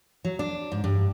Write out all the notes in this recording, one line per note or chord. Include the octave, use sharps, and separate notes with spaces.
F#3
D4
G#2
G2